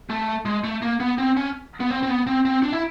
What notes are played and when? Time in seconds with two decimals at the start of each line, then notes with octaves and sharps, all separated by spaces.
0.10 A3
0.45 G#3
0.64 A3
0.82 A#3
1.00 B3
1.18 C4
1.37 C#4
1.80 B3
1.91 C4
2.03 C4
2.09 B3
2.27 C4
2.45 C4
2.62 D4
2.73 E4